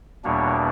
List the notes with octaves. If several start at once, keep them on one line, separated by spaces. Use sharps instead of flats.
E2 B2 G3 A#3 D4 C#5